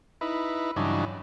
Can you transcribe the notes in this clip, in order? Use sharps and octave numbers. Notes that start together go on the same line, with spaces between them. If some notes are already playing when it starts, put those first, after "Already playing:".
D#4 E4 B4
G2 C#3 E3 F#3 D4 D#4